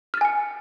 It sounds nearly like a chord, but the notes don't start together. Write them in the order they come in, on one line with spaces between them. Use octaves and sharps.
F6 A6 G#5 C#7